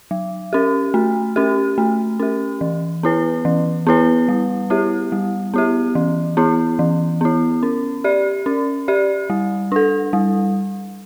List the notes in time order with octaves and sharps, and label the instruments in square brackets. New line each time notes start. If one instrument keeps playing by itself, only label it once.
[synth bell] F#3
C#4 G4
A3
C#4 G4
A3
C#4 G4
E3
B3 E4 B4
E3
B3 E4 B4
G3
B3 E4 G4
G3
B3 E4 G4
E3
B3 E4
E3
B3 E4
C#4
G4 D5
C#4
G4 D5
G3
D4 A4
G3